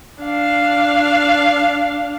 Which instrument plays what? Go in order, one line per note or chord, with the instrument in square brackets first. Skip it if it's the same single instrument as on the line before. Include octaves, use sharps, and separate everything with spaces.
[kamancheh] D4 F5